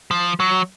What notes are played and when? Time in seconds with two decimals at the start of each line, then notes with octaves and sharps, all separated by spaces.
0.11 F3
0.40 F#3